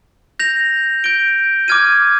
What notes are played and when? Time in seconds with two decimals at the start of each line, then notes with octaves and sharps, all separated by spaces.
0.40 G6 A#6 F7
1.04 G6 D7 G7
1.68 D6 F6 G#6 D#7